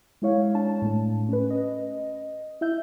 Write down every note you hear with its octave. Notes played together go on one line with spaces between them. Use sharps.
G#3 E4 C#5 F5
D4 A5
A2 A3
C#4 B4
D#5
E4 E5 G6